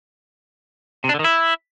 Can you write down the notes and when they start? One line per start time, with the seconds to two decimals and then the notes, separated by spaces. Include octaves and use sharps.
1.04 C3
1.09 D4
1.14 D3
1.19 D#3
1.24 E4